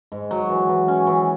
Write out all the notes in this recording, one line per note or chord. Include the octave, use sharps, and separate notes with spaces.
G#2
F#3
E3
E3
C#4
E3